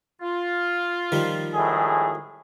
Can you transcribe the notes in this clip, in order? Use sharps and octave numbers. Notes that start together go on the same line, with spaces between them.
F4
D#3 F3 G3
G#1 A2 G#4